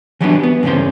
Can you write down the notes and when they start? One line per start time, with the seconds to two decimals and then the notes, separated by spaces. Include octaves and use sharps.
0.21 E3 F#3 G3 B3 D4
0.43 B3
0.63 E2 G2 C#3 C#4 C5